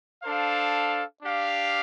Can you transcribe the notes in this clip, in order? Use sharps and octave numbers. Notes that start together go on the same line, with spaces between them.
D4 A4 C5 F5
D4 G4 F5